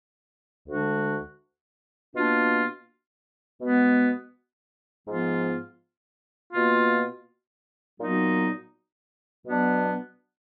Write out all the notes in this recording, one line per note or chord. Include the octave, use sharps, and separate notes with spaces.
D2 D3 G#3 D4 F#4
B2 A#3 D4 F4
B2 G#3 B3
G#2 F3 B3 F4
B2 A#3 F4
A#2 F#3 B3 D#4 F#4
B2 F#3 B3 D4